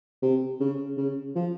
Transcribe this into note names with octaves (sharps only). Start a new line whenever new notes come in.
C3
C#3
C#3
F3